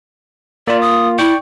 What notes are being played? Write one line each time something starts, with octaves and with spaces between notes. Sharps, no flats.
A#3 F4 D5
D#6
E4 D5 G5 C#6